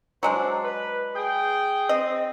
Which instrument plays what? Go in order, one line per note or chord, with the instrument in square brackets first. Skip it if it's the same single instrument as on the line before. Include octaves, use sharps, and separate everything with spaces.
[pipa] F#3 G#3 D4 [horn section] C5
[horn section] B4
G#4 G5
[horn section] C4 [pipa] D#5